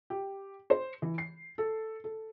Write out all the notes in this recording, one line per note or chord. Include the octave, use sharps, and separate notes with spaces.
G4
C5
E3
C7
A4
A4